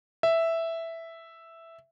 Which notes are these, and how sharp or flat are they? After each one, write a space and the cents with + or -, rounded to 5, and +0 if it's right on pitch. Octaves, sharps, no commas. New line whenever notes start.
E5 +0